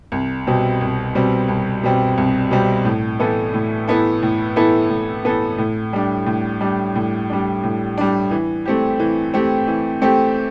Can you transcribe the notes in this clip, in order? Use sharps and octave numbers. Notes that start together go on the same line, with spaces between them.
C2
B2 G3 C4
C2
B2 G3 C4
C2
B2 G3 C4
C2
B2 G3 C4
A2
E3 B3 E4 A4
A2
E3 B3 E4 A4
A2
E3 B3 E4 A4
A2
E3 B3 E4 A4
A2
G3 D4
A2
G3 D4
A2
G3 D4
A2
G3 D4
E3
A3 C4 G4
E3
A3 C4 G4
E3
A3 C4 G4